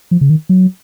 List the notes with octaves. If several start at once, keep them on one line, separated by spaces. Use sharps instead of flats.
F3
C#3
D#3
F#3